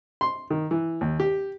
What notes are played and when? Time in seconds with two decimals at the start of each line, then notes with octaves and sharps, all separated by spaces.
0.21 C6
0.50 D#3
0.71 E3
1.01 D#2
1.20 G4